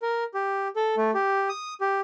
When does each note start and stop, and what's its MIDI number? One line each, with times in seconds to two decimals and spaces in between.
0.02 0.24 70
0.34 0.68 67
0.76 0.95 69
0.97 1.11 57
1.15 1.49 67
1.49 1.74 87
1.81 2.01 67